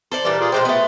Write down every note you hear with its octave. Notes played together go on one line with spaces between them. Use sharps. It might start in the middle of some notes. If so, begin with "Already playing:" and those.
A4 C5 D5
A#2 E3 G3 D5
F4 G#4 D5
A#2 G#3 C5 G5
A3 B3